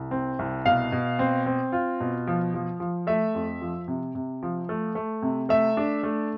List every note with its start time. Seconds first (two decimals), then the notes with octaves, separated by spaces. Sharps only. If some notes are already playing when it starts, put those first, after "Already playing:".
Already playing: C2
0.11 C4
0.39 C2
0.66 B2 F5
0.92 B2
1.19 C4
1.46 C4
1.72 F4
2.00 B2
2.27 F3
2.54 F3
2.80 F3
3.07 A3 E5
3.35 F2
3.62 F3
3.88 C3
4.15 C3
4.43 F3
4.69 A3
4.95 A3
5.22 C3
5.49 A3 E5
5.77 D4
6.03 A3